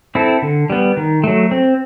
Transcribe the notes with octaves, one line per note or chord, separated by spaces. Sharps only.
C4 E4 A4
D3
G3 B3
D#3
F#3 A3
C4